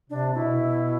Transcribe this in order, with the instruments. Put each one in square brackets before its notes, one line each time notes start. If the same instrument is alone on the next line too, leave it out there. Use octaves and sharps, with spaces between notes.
[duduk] C3 [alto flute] D4
[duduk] B2 [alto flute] E4